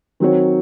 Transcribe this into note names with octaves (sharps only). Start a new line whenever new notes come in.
D#3 F#3 C4 F#4 C#5